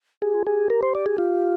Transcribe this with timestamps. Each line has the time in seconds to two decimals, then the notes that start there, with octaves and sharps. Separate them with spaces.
0.22 G4 G#4
0.34 F4
0.45 G4 G#4
0.70 A#4
0.83 C5
0.95 D5
1.06 G#4
1.18 F4